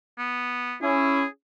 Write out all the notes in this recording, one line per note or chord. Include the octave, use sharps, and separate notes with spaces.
B3
C#4 E4 G#4